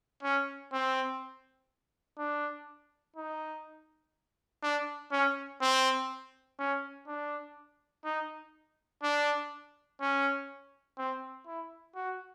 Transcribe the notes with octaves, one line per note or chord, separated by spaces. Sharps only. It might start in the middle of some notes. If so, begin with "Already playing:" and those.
C#4
C4
D4
D#4
D4
C#4
C4
C#4
D4
D#4
D4
C#4
C4
E4
F#4